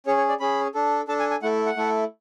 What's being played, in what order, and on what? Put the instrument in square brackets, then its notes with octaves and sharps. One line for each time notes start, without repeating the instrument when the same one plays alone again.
[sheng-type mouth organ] C#4 G#4 C#5
C#5
D5
C#4 G#4 B5
D4 A4
D4 A4 A5
G#5
G#5
A3 E4 A4 F#5
F#5
A3 E4 A4